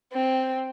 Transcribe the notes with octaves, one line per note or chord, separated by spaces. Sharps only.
C4